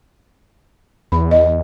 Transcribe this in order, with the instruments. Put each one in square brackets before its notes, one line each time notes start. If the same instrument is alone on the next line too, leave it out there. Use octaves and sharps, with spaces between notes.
[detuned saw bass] E2 [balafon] B5
[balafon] D#5